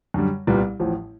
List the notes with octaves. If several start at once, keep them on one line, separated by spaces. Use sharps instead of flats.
F#2 D3 G3
C2 A#2 G3 B3
A1 A2 F3